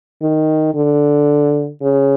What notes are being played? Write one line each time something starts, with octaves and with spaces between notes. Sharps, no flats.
D#3
D3
C#3